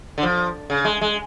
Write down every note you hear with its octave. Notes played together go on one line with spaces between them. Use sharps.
D3
F3
C#3
G#3
G#3